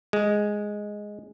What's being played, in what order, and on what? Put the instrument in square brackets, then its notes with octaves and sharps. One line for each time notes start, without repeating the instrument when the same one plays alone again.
[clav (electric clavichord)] G#3